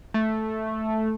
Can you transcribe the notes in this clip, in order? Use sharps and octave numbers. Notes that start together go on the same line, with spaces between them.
A3